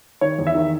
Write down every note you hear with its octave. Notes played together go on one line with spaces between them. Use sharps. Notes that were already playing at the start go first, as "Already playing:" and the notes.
D#3 C#5
E2
E5
D#3